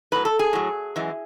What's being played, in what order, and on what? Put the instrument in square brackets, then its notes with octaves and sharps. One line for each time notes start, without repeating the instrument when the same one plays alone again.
[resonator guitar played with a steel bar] A2 F#3 B4
A4
G#4
A2 F#3
F#2 E3 G#3